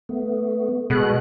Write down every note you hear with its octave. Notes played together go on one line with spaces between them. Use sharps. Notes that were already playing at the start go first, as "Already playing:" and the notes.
A3 B3
B2 G#3 F#6